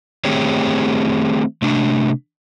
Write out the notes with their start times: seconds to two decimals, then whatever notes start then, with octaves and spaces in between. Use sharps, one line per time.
0.25 D#3 A3 C4 G4 G#4 C#5
1.62 C3 A3 D4